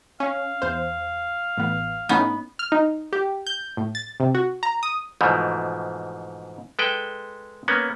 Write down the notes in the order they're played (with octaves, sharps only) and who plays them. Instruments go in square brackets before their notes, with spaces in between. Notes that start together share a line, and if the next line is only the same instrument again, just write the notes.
[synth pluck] C#4 [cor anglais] F5
[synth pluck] E2 C5
A1 B3
[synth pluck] A2 C#4 D#4 [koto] B3
[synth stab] F6
D#4
G4
G6
A2
A6
C3
F#4
A#5
D#6
[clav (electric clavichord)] G#2 B2 E3 F3 A3
G#3 A4 B4 G5
A#3 B3 C#4